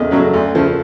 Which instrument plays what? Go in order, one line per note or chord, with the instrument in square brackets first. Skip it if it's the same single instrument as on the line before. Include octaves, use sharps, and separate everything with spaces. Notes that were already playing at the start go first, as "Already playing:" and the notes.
Already playing: [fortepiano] E2 C#3 A3 D#5
C#3 F#3 A3
D2
C#3 F3 A3